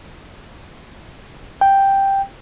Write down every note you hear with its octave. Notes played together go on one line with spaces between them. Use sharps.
G5